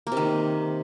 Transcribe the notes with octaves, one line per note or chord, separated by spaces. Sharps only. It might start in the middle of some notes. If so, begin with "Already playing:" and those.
A#3
C3
D#3